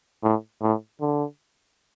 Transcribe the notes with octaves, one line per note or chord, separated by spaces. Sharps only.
A2
A2
D3